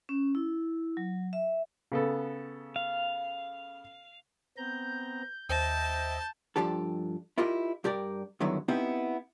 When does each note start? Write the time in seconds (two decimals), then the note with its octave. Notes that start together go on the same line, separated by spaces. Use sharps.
0.09 C#4
0.35 E4
0.97 F#3
1.33 E5
1.92 C#3 B3 A4
2.76 F5
4.57 B3 C4 A#5 G6
5.49 D#2 C5 D#5 E5 G5 A5 G6 A#6
6.56 G2 C#3 F3 D4 G4 A4
7.38 E4 F4 G4 A#4 D#5
7.84 G2 G4 A#4 D5
8.40 G2 D3 D#3 F#3 B3 E4
8.68 B3 C4 D#4 E4 G4